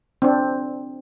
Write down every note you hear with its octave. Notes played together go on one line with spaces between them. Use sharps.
C4 D4